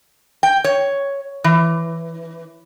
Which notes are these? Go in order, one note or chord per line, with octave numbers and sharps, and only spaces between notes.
G5
C#5
E3